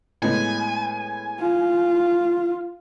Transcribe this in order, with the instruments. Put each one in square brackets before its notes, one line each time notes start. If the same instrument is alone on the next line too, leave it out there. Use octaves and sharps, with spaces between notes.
[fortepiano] A2 G#3 B3 [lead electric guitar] G#5
[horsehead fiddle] F4